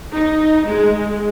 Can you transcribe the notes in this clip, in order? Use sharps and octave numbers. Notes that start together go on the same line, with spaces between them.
D#4
G#3